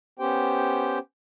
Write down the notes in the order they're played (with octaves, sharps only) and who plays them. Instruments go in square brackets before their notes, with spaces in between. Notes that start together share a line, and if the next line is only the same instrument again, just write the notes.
[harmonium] B3 C#4 G4 C5 G5